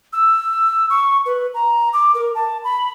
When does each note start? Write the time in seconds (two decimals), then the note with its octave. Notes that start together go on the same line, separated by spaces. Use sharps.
0.13 E6
0.90 C#6
1.26 B4
1.54 A#5
1.93 D6
2.15 A#4
2.35 A5
2.64 B5